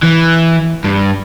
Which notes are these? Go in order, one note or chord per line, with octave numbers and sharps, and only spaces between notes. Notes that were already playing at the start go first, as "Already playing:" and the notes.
E3
G2